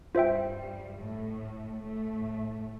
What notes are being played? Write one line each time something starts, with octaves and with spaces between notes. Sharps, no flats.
G2 G3 F4 C5 E5 G5
A2 A3
A2 A3